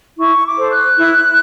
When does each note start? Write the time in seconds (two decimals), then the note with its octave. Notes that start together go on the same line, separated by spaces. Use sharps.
0.17 E4 C#6
0.44 D6
0.57 A4 C5
0.70 F#6
0.98 E4